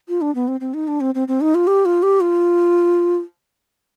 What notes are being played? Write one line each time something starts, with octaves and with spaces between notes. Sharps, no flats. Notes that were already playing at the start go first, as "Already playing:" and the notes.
F4
D4
B3
C4
C4
D#4
D4
C4
C4
C4
D#4
F4
G4
F4
G4
F4